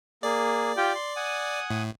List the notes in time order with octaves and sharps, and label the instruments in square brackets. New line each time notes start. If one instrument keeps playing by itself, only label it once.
[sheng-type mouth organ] A#3 G#4 [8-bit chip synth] D5
[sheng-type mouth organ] F4 G4 G5
C6
F#5 G#5 D#6
[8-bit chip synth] A2